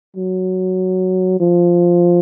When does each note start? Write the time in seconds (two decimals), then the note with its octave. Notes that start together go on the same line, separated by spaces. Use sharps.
0.17 F#3
1.40 F3